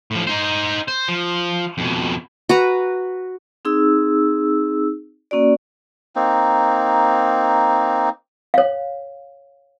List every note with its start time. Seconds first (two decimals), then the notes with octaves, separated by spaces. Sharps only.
0.11 A2 F3
0.27 D#4 C5
0.88 C5
1.08 F3
1.78 F2 B2
2.49 F#4 B4 A#5
3.65 C4 D#4 G#4 E6
5.31 A#3 C#4 F#4 D5
6.16 A#3 C4 D#4
8.54 C#5 F5